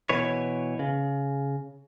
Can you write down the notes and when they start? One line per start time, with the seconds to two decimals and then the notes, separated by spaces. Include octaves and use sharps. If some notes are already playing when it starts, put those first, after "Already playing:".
0.09 B2 E3 B4 C#5
0.79 C#3